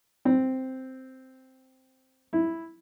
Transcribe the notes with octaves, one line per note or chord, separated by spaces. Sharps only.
C4
E4